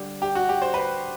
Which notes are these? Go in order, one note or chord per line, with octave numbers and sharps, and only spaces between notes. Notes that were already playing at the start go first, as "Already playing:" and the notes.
Already playing: D3 G3
G4
F#4
G4
C5
B4